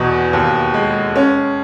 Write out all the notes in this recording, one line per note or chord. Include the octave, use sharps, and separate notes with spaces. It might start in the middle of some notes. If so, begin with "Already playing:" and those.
Already playing: E2 B2
D#2
G#3
C#4